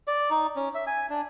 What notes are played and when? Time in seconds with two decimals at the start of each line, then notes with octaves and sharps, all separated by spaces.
0.08 D5
0.30 D#4
0.56 C#4
0.75 E5
0.87 G#5
1.10 D4